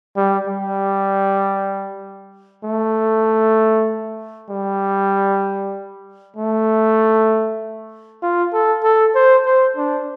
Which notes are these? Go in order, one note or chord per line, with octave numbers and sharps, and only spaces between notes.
G3
G3
A3
G3
A3
F4
A4
A4
C5
C5
D4